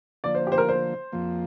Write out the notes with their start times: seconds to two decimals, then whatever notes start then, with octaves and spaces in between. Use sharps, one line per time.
0.24 D3 F3 A#3 D5
0.35 C5
0.47 G4
0.52 C5
0.58 A#4
0.69 C5
1.12 F2 F3 A#3